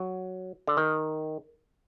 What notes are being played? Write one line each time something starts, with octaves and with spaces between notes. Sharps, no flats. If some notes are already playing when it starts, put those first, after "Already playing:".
Already playing: F#3
D3
D#3